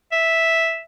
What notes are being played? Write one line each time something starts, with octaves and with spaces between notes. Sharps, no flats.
E5